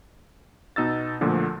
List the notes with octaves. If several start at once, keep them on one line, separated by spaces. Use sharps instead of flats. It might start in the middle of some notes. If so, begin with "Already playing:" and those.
B2 D#4 E6 A6
D2 A#2 D3 F3